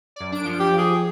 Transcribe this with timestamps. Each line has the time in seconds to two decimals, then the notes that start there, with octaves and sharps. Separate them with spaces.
0.16 F#2 D5
0.32 D4 D7
0.45 F3
0.59 G4
0.78 G#4